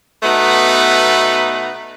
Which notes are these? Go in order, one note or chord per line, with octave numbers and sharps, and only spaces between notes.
B2 A3 B3 D#4 B4